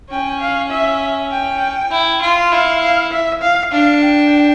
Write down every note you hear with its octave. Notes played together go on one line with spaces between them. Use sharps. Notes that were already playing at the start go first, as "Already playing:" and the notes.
C#4 G5
F5
E5
G5
E4
F4
E4 F5
F5
E5
F5
D4 F5
G5